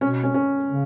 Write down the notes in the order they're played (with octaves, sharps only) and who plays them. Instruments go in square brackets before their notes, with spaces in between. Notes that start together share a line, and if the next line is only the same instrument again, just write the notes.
[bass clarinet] B2 [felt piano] C#4
[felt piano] C#4
C#4
[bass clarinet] C#3